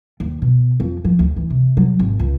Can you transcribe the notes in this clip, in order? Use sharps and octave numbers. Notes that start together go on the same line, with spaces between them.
D#2
B2
F2
F3
D2
E3
C3
F#3
G#1
C#2